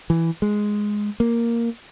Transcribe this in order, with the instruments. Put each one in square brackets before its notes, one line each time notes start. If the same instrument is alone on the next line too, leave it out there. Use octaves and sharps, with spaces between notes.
[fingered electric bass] E3
G#3
A#3